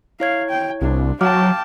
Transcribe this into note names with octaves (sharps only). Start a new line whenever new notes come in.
E4 C#5 F5 G#6
G5
C2 D4
F#3 F5 G5 A5 D6 F6